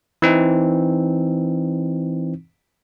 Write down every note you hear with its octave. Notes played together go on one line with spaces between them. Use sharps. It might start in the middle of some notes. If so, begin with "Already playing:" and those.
E3 C4 D#4